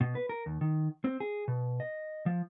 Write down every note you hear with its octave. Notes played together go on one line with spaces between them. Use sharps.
B2
B4
A#4
D#2
D#3
C4
G#4
B2
D#5
F3